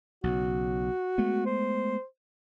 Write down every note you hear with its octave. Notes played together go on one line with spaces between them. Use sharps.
B1 C#3 F#4
G#3 A3 B3
C5